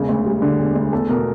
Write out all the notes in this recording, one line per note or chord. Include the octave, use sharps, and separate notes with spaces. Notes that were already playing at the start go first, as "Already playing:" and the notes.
Already playing: E1 C#3
D2
G3
D3
E1
D2
E2 A4
B2 A#4